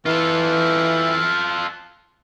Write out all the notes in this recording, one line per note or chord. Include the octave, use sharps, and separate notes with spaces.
E3 F4 A4